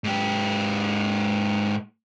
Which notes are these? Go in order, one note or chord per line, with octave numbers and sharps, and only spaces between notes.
G#2 G4